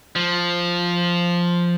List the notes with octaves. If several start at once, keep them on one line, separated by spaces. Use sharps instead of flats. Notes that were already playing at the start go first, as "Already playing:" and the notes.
F3